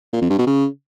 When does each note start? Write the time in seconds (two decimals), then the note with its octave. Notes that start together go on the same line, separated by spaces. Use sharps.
0.13 A#2
0.21 F2
0.30 G2
0.38 B2
0.47 C#3